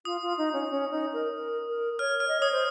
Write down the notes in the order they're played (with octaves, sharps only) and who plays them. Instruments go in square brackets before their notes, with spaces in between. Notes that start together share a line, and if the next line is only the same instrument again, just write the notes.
[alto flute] F4 [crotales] D#6
[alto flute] F4
D#4
C#4
C#4
D#4
A#4
A#4
A#4
[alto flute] C#5 [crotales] F6
[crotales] F6
[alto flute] D#5
[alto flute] C#5 [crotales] D#6
[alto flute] C5